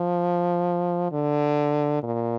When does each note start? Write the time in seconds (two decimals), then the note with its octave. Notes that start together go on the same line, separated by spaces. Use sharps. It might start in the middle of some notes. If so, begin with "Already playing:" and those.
Already playing: F3
1.12 D3
2.03 A#2